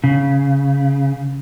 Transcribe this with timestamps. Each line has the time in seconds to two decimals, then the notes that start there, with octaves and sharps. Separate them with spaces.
0.04 C#3